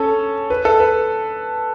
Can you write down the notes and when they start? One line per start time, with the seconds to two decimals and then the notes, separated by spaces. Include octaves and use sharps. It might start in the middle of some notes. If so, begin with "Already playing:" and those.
Already playing: C#4 A4
0.50 B4
0.65 A4
0.80 B4